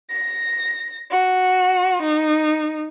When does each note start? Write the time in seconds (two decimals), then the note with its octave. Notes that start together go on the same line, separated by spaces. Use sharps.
0.10 A#6
1.10 F#4
2.02 D#4